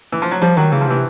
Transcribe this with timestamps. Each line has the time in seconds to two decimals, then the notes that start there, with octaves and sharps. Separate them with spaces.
0.12 E3
0.22 F3
0.31 F#3
0.41 F3 G3
0.57 D#3 F#3
0.72 C#3 E3
0.81 F3
0.88 C3 E3